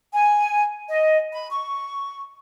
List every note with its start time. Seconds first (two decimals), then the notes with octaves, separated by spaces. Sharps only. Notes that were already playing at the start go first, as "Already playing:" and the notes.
0.12 G#5
0.88 D#5
1.33 B5
1.50 C#6